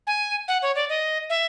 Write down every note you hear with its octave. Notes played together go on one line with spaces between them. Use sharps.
G#5
F#5
C#5
D5
D#5
E5